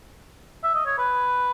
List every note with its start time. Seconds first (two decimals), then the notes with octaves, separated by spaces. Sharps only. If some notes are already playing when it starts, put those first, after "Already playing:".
0.64 E5
0.75 D#5
0.86 C#5
0.98 B4